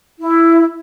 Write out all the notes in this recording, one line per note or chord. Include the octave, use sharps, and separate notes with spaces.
E4